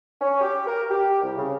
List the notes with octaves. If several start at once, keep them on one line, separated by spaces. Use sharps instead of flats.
C#4
G4
A#4
G4
C2
C#3